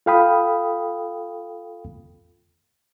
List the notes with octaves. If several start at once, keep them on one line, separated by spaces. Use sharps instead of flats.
F4 A4 F5 G5 B5 D#6